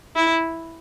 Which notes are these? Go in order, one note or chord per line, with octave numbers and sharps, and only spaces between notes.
E4